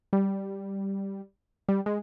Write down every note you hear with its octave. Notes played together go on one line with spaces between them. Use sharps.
G3
G3
G#3